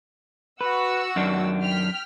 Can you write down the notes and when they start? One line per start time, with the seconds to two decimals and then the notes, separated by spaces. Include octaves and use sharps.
0.61 F#4 B4 F#5 E6
1.16 F#2 D#3 D4
1.60 G5 F6 B6